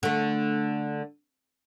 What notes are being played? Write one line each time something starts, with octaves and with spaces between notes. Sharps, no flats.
D3 A3